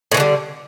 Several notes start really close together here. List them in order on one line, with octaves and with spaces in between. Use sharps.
A2 E3 D3 G3